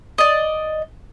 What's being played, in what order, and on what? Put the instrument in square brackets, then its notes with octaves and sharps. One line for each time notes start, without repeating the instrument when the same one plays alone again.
[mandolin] D5 D#5